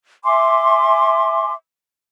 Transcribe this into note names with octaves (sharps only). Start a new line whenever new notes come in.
E5 G#5 C6 D6